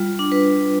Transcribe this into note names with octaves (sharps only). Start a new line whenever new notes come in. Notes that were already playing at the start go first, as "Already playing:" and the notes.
Already playing: G3 F4
D4
B4